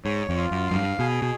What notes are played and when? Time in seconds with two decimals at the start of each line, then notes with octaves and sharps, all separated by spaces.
0.05 G#2 C#5
0.29 F2
0.36 F4
0.51 F#2
0.67 F#2 F5
0.75 G2
0.99 B2 G#4
1.22 B2